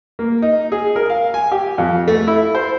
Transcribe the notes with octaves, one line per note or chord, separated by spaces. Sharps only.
A#3
D#4
G#4
A#4
F5
G#5
G4
F2
A3
E4
C5